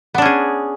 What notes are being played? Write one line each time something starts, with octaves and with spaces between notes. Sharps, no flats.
B3 C#4 D4 G#4